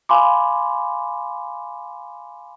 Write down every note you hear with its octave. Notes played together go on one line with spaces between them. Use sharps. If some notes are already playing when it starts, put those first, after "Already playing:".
F5 G#5 B5 C6 D6